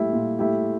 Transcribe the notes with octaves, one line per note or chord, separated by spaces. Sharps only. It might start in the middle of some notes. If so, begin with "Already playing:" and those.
Already playing: A#2 A3 E4 G4
A#2
A3 E4 G4